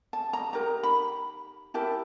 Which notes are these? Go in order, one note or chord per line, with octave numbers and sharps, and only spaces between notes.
A5
A#5
D#4 G4 A#4 A#5
B5
E4 G4 A#4 A5